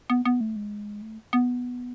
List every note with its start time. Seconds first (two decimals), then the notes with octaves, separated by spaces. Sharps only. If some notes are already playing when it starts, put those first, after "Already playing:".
0.10 B3
0.25 B3
0.41 A3
0.56 G#3
1.02 A3
1.33 B3